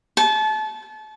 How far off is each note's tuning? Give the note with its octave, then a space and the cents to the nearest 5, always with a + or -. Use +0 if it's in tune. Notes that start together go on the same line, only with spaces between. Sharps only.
A5 -30